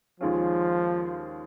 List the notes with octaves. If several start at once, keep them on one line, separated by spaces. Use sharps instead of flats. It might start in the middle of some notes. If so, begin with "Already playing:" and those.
D#2 D#3 F3 G#3 C#4 F4